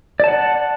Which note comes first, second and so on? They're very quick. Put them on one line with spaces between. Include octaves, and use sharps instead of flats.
D5 A5 F#5